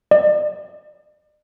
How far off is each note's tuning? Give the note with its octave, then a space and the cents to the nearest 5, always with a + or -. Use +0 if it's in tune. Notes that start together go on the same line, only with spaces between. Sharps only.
D5 +40